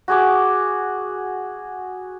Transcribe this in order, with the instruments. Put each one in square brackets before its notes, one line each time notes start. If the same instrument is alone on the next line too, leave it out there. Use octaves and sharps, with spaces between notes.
[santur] F#4 G#4 D6